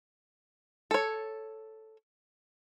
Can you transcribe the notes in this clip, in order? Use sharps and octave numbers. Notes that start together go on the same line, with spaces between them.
A4 C#5